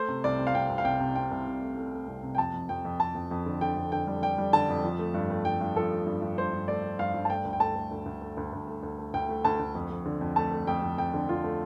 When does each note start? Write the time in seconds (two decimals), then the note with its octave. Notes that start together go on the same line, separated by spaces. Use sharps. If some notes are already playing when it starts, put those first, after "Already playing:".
Already playing: A3 C5
0.08 C3
0.24 C2 D5
0.39 C3
0.47 F5
0.54 C2 G5
0.69 C2
0.78 F5
0.85 C2 G5
1.00 C3
1.15 C3 G5
1.31 C2
1.46 C3
1.62 A3
1.77 A3
1.93 A3
2.07 C2
2.23 C3
2.35 G5
2.38 F2 A5
2.54 F2
2.69 F2 G5
2.85 F2
3.00 F2 A5
3.15 F2
3.31 F2
3.46 D3
3.61 D3 G5
3.77 F2
3.92 D3 G5
4.07 G3
4.22 G3 G5
4.38 G3
4.53 D3 A5
4.69 F2
4.83 F3
4.99 A3
5.14 G2
5.30 A3
5.45 G2 G5
5.61 G2
5.76 F3 A4
5.91 A3
6.07 G2
6.22 G2
6.37 G2 C5
6.53 G2
6.68 A3 D5
6.83 A3
6.99 G2 F5
7.14 G2
7.25 A5
7.30 A3 G5
7.45 D2
7.53 G5
7.60 A3 A5
7.76 A3
7.91 D2
8.06 D2
8.21 A3
8.37 D2
8.53 D2
8.67 A3
8.83 D2
8.99 A3
9.14 D2 G5
9.29 A3
9.45 D2 A5
9.60 D2
9.75 F2
9.90 F2
10.06 D3
10.21 F2
10.36 A3 A5
10.52 A3
10.67 F2 G5
10.82 F2
10.97 F2 G5
11.14 D3
11.29 F2 F4
11.44 A3